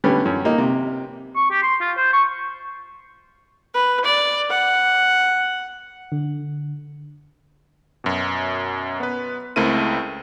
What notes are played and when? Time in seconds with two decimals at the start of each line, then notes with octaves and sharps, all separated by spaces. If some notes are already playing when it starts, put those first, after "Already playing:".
0.04 D3 G3 A3 B3 C#4
0.25 F#2
0.45 A#3 D#4
0.58 C3
1.36 C#6
1.51 G4
1.63 C6
1.81 F4
1.97 C5
2.13 C#6
3.74 B4
4.05 D5
4.50 F#5
6.12 D3
8.04 F#2 B2
9.00 B3 B4
9.56 C#2 A3 C4 E4 A#4 D#7